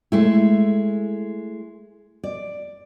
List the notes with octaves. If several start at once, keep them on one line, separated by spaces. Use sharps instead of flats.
G#3 A3 E4
D5